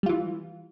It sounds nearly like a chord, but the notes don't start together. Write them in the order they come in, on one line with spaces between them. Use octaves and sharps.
G3 F4 E3